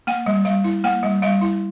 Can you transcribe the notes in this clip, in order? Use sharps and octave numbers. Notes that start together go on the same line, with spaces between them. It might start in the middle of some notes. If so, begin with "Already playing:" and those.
A#3 G5
G3
G3 F5
E4
A#3 G5
G3
G3 F5
E4